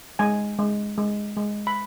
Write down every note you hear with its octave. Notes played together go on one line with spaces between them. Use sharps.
G#3 G#5
G#3
G#3
G#3
B5